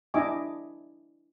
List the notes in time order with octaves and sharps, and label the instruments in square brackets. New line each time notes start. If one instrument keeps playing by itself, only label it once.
[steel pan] D4 E4 D#5 E5 G#5 D6